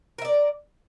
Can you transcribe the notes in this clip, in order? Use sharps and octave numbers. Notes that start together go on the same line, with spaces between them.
A#4 D5 E5